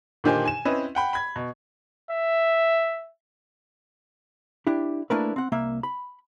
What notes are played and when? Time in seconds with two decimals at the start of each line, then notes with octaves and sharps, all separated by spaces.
0.24 A#2 D3 D#3 G4 C5 G#5
0.45 G#5 E7
0.65 C4 C#4 E4 B4 D#5
0.95 F#5 G5 B5
1.13 B5 G#6
1.36 B2
2.11 E5
4.67 D4 E4 G4
5.10 A3 A#3 D4 E4 A#4 B4
5.36 C4 F#5
5.52 C2 A#3 E5
5.83 B5